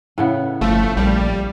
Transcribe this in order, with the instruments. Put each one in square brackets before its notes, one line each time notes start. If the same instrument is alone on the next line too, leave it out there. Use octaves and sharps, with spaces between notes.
[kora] A2 C#3 B3
[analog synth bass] G1 [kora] F3 [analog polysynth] A3
[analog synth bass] A#1 [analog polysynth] G3